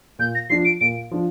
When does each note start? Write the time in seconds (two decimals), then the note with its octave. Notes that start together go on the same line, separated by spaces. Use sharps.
0.19 A#2 G6
0.35 A#6
0.50 F3 D4 F4 C7
0.65 D7
0.81 A#2 D7
1.11 F3 D4 F4